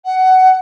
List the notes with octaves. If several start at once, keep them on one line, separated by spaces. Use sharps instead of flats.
F#5